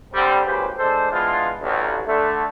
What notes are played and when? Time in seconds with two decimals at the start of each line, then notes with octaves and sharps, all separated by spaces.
0.14 D3 G3 C4
0.45 G#1 D#2 C#3 G4 B4 C5
0.77 G#3 D4 A4 C5
1.12 G#3 B3 D4 E4 F4
1.62 A1 D2
2.07 D3 A3